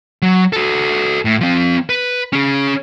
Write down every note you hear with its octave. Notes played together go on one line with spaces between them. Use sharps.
F#3
F#4 A4
A2
F3 C4
B4
C#4 G#4